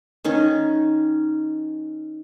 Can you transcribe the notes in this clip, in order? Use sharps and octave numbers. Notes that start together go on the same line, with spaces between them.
D#3 C#4 D#4